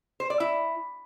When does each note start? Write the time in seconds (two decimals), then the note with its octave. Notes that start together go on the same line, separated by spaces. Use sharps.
0.20 C5
0.30 D5
0.40 E4